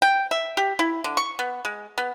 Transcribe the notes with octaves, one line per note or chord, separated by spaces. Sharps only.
G5
E5
G4
E4
D3
C#6
B3
G#3
B3